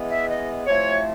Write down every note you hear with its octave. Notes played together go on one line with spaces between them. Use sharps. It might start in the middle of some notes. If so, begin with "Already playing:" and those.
Already playing: E3 G#3 B3
E5
D#5
C3 F3 A3 C4 E4 C#5